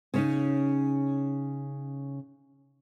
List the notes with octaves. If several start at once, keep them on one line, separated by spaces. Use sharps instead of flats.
C#3 C#4 D#4